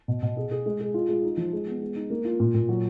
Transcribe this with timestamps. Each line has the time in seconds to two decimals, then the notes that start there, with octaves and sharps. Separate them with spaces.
0.08 B2
0.22 B2
0.37 G#4
0.51 G#4
0.66 G#3
0.80 G#4
0.94 F4
1.09 G#3
1.24 D#4
1.37 F3
1.53 G#3
1.67 B3
1.82 G#3
1.96 D#4
2.10 A#3
2.25 F4
2.40 A#2
2.55 A#2
2.69 F#3